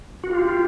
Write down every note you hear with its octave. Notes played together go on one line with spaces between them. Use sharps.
F#4
F4 G4
F4